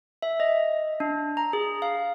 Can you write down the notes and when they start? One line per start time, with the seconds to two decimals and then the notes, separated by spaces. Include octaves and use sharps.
0.22 E5
0.40 D#5
1.00 D4
1.37 A#5
1.53 G#4
1.82 F5